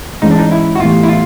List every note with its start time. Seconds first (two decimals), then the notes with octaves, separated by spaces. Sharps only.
0.22 G#2 E3 G#3 C#4 D#4
0.31 D4
0.39 D#4
0.52 E4
0.75 F#4
0.80 A2 E3 G3 B3 F4
1.03 E4
1.08 F4